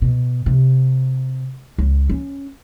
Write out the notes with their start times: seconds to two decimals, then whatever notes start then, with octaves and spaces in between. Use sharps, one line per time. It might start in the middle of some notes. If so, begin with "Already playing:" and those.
0.02 B2
0.46 C3
1.78 C#2
2.10 C#4